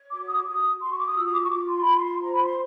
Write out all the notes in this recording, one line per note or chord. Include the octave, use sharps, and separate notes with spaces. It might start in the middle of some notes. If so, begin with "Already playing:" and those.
Already playing: C#5
F#4 D6
D#6
D6
F#4 D#6
F#4 C6
C#6
D6
D#6
F4 E6
D#6
D6
C#6
F4 D6
C6
F4 B5
C6
C5 A#5
B5
C6